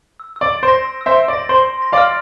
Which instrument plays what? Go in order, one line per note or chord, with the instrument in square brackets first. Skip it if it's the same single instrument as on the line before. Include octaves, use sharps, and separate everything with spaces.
[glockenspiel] E6
E6
[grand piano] D5
[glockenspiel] D7
[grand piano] C5
[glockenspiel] A#6
E6
E6
[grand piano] C5 E5
[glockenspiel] D7
[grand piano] D5
[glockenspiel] A#6
[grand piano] C5 [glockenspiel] C6
[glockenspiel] C6
A#6
[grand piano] D5 F5
[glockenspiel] F6